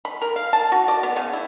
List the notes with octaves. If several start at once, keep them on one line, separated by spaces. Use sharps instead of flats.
B5
A#4
F5
A5
F#4
D5
B3
C#3
E4